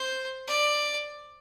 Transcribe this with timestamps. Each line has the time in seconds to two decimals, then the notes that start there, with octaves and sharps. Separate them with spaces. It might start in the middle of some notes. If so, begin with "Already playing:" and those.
Already playing: C5
0.47 D5